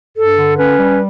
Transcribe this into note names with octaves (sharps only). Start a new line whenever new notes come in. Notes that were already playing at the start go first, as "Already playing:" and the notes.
G2 A4
D3
C#4 B4
G3